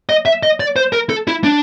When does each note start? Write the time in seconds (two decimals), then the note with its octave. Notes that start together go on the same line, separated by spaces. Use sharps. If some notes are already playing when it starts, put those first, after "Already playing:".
0.09 D#5
0.26 E5
0.43 D#5
0.60 D5
0.76 C5
0.93 A#4
1.10 A4
1.28 E4
1.44 D4